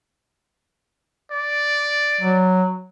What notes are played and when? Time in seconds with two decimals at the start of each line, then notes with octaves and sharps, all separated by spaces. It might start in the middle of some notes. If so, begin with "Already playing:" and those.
1.32 D5
2.21 F#3